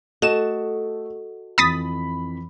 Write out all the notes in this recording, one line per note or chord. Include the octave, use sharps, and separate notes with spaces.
A3 F#4 A4 D#5 E7
F2 E3 B5 D#6 A6 B6